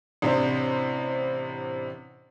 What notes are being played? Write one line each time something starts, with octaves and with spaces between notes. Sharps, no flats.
A1 C3 D4 C5